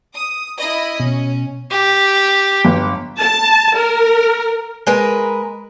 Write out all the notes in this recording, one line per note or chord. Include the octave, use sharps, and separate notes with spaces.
D#6
E4 D#5 B5
B2 C#4
G4
G1
A5
A#4
G#3 A#4 B4 G#5